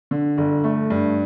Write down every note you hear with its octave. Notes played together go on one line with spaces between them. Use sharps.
D3
G1
A3
G2